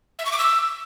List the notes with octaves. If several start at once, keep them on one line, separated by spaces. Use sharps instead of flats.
E5
C#6
D6
E6